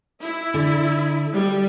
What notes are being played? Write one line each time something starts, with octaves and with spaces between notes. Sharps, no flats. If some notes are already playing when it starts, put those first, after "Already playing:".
E4
D3
G3